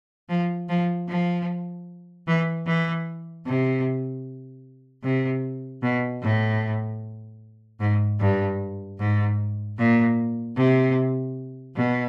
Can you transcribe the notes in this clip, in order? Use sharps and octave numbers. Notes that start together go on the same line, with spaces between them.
F3
F3
F3
E3
E3
C3
C3
B2
A2
G#2
G2
G#2
A#2
C3
B2